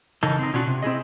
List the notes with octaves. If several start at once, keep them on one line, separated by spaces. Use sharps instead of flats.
C#3 E3 D#4 A4 A#4
C4 D#4
B2 C#4 D4 F4 F#4
C3
C4 E4 G#4 D#5